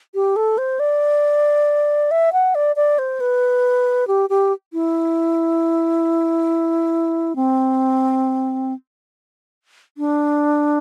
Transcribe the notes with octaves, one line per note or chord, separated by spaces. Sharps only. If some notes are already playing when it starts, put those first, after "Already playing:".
G4
A4
C5
D5
E5
F#5
D5
D5
C5
B4
G4
G4
E4
C4
D4